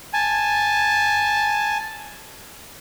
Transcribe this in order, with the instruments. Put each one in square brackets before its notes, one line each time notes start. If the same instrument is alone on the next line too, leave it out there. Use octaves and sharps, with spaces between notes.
[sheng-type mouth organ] G#5 A5